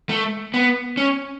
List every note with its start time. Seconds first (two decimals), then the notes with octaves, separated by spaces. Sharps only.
0.09 A3
0.54 B3
0.97 C#4